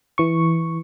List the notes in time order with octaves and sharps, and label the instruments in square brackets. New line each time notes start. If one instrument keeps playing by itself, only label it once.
[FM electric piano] E3 C#6